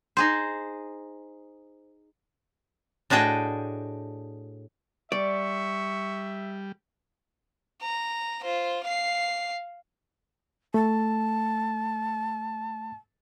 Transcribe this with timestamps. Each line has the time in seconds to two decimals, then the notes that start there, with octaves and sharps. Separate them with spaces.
0.17 D#4 G#4 C5
3.10 A2 D4 F#4 G#4 D#5 G5
5.12 G3 D5 E5 C#6
7.82 A#5
8.44 F4 C5
8.84 F5 C7
10.74 A3 A5